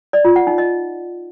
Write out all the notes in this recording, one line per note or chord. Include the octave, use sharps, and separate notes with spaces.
D5
F4
F#5
D#4
D#5